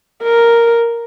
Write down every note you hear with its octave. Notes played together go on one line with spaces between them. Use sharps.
A#4